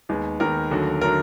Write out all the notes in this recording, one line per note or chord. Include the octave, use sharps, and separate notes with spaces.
D#2 D#3 G#3 B3
D#2 D#3 G#3 B3 A#4
D#2 D3 F#3 A3
D3 F#3 A3 A#4